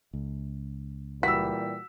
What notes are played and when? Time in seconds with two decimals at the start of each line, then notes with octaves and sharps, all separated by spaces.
0.13 C#2
1.23 A#2 E3 G3 F#4 E6 B6